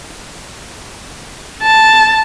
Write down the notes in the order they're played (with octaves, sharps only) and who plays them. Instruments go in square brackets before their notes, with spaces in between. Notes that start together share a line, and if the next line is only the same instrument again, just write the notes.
[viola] A5